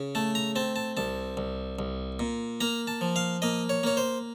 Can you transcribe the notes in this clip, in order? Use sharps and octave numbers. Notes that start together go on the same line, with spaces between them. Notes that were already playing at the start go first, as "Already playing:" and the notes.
Already playing: C#3
A3 A5
A#5
C4 A5
A5
C2 A5
C2
C2
A#2
A#3 A#5
A5
F3
F5
A#3 D#5
C#5
A#3 C#5
C5